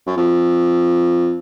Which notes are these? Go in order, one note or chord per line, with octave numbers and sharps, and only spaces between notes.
F#2
F2